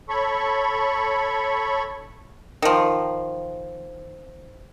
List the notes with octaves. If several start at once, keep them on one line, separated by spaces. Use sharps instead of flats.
A4 C#5 B5 C#6
D#3 F3